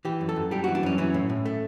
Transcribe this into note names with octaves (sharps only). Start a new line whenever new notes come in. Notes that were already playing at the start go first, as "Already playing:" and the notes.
E3 G4
F#2
A4
F#2
G3 G4
F#4
E3
D4
F#2 C#4
E3 C#4
A2
A2
A3